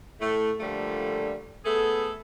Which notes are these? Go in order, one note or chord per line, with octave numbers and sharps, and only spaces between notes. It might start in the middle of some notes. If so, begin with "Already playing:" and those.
A2 A3
A#2 D3 F3 G3 A3
A3 B3 G#4 A4